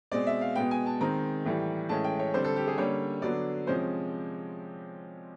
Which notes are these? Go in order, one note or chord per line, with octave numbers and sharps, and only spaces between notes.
B2 G#3 C4 D5
E5
F5
B2 G#3 B3 G5
G#5
A5
D#3 G#3 C4 A#5
A2 E3 G3
A2 E3 G#3 C#4 A5
G5
C#5
D3 G3 C4 C5
A4
G4
G#4
D3 G3 A#3 C#4 C#5
D3 F#3 B3 D5
C3 F3 G#3 C#4 C5